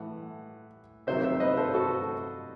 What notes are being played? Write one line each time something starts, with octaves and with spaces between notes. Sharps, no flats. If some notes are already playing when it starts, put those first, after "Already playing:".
Already playing: A2 E3 F#5
C3 D#3 F#3 C5 E5
C5 E5
B4 D#5
A4 C5
F#4 A4